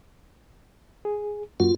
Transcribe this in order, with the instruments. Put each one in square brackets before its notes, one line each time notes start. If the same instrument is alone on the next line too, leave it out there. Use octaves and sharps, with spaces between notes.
[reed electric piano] G#4
[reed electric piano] F#2 A#3 F#4 [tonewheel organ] F4